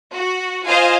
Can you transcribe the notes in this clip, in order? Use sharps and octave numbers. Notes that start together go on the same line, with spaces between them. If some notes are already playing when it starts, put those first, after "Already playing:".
F#4
F4 C5 D#5 F5 G#5